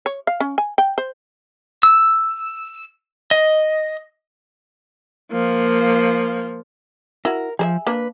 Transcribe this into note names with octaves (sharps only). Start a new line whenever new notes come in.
C#5
F5
C#4
G#5
G5
C5
E6
D#5
F3 A#3
E4 F#4 A#4
F3 G#4 C5 E5
A#3 D4 B4